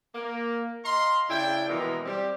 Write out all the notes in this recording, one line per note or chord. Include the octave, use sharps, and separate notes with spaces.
A#3
D#5 F5 A#5 C6
C#3 D4 E4 G5
B2 E3 F3 G#3 A#3 A#4
G3 C4 G4